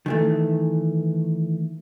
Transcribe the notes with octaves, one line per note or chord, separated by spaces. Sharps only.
D#3 E3 A3